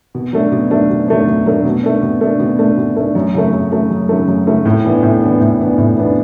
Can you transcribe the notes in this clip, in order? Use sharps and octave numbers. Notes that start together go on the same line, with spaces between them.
B2
F#3 A3 D4
B2
F#3 A3 D4
B2
F#3 A3 D4
B2
F#3 A3 D4
B2
A3 D4
B2
A3 D4
B2
A3 D4
B2
A3 D4
F#2
C#3 F#3 A3
F#2
C#3 F#3 A3
F#2
C#3 F#3 A3
F#2
C#3 F#3 A3
A2
E3 B3 D4
A2
E3 B3 D4
A2
E3 B3 D4
A2
E3 B3 D4